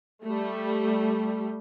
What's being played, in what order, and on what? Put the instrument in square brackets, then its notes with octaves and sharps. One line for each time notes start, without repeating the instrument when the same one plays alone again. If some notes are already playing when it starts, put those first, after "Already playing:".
[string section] G3 A3